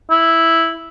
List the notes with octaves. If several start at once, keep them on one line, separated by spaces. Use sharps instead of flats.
E4